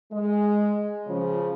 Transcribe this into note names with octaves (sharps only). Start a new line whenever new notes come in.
G#3
C#3 F3 C#4